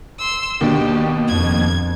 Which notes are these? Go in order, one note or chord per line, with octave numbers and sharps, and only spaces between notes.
C6 E6
D#2 B2 D4 G4
F2 G#6